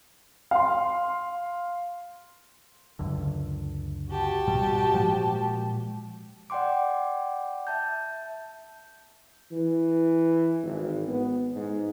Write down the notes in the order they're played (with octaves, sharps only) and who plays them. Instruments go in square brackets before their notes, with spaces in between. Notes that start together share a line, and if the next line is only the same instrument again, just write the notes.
[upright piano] F5 C6
[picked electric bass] C#2 F#2 D3
[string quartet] F#4 G4 A5
[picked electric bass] G#2 B2 G3
A#2 F3 G#3
[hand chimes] D5 F#5 G5 C6 D6
E5 A5 G6
[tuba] E3
G#1
B3
G#2